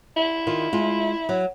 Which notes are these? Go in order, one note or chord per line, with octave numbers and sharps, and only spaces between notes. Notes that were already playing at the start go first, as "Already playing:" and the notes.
E4
D#3 F4
G#3 F4
F#3